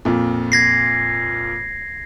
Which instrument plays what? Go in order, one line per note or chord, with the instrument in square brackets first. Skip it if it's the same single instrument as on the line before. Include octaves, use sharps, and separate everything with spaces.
[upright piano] F2 A#2
[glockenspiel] G#6 A#6 C7